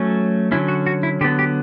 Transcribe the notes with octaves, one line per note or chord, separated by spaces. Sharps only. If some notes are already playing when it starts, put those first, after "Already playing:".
Already playing: F#3 A3 C#4
D3 F#3 C#4 E4
F#4
F#4
E4
D3 F#3 B3 G4
G4